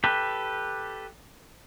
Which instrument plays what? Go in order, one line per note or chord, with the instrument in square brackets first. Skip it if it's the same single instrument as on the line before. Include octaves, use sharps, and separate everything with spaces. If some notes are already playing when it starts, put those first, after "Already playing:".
[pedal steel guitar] G4 A4 B4